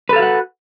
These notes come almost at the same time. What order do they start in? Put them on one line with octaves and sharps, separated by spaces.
B4 A4 F5 F#4 F#5